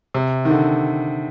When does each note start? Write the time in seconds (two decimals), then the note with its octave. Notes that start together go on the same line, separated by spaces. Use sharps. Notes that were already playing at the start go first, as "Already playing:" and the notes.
0.14 C3
0.45 D#3
0.50 D3